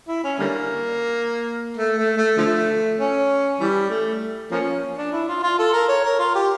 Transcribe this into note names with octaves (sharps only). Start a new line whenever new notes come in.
E4
C#4
D3 G3 A#3
A3
A3
A3
D3 F3 A3
C#4
E3 G3
A3
F3 A#3 C#4
D4
E4
F4
F4
A4
A#4
C#5
A#4
F4
G4